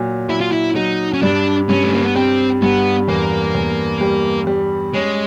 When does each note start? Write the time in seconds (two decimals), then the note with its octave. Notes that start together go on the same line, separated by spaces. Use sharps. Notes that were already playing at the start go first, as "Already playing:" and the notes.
Already playing: A#2 F#3
0.30 F#3 E4
0.41 F4
0.52 E4
0.76 F#3 D#4
1.14 C#4
1.22 G2 D4
1.69 G2 C#4
1.84 A3
1.94 A#3
2.05 B3
2.15 G3 C4
2.62 G2 B3
3.08 E2 A#3
3.55 E2
4.01 G3
4.47 G3
4.94 G#3 C#4